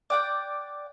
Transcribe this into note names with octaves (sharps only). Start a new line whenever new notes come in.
D5 F#5 G5